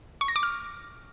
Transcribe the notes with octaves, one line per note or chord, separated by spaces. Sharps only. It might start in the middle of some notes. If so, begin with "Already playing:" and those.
C#6
A#6
D6
F6